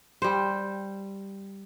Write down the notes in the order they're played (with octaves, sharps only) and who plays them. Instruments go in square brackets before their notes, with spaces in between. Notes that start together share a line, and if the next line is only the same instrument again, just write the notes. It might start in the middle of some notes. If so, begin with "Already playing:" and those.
[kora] G3 C5